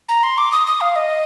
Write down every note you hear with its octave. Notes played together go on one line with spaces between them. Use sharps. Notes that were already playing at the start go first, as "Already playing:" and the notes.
A#5
C6
D6
D#6
D#6
F5
D#5